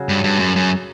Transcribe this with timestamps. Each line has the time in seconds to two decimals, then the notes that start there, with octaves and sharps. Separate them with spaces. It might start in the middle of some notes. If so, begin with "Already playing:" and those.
Already playing: C#3 F#3
0.09 G2
0.24 G2
0.40 F#2
0.56 F#2